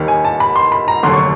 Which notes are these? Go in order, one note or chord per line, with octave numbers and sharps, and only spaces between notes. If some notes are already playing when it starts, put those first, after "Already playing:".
Already playing: D#2 D#3 G3 A#3
G#5
A5
B5
C6
B5
A#5
F1 D#2 D3 F#3 C6
C#6